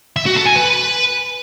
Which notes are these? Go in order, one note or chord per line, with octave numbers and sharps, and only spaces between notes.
E5
F#4
A4
G#5
B4